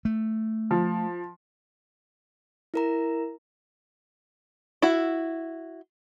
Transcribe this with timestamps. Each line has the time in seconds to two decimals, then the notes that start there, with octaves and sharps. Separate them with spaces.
0.05 A3
0.71 F3
2.74 E4 A#4 A#5
4.82 E4 F#4